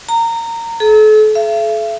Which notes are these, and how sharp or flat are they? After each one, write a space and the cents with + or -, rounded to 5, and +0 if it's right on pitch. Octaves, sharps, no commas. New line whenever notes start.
A#5 -20
A4 -40
E5 +45